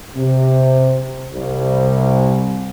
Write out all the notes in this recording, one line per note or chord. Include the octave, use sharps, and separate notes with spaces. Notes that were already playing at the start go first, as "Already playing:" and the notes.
C3
C2